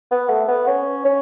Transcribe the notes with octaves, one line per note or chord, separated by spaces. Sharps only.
B3
A3
B3
C#4
C#4